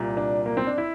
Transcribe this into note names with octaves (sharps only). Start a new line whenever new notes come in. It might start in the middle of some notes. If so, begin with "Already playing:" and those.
Already playing: C2 A#2 G3
D4
A#3
C4
D4
E4